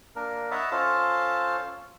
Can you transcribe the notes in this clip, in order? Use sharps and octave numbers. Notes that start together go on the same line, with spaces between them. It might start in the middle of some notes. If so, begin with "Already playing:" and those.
A#3 D4 A#4
C#5 D#5 E5 F#5 A5 B5
C#4 F4 A4 C5 F5 A5